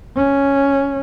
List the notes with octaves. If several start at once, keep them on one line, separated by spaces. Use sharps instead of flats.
C#4